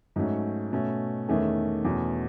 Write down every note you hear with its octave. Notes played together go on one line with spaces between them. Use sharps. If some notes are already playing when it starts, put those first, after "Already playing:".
G#2 F#3 A3 C#4
B2 A3 C#4
E2 D#3 A3 C#4 G#4
E2 B2 A3 C#4